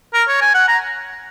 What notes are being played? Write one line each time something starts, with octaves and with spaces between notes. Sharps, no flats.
A#4
C#5
G#5
F#5
A#5